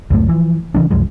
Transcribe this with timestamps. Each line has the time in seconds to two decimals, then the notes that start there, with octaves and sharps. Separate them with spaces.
0.10 C#2 F#2 A2 A3
0.28 E3 F3
0.74 C#3 E3 G#3 D4
0.90 C2 F#2 F3 G#3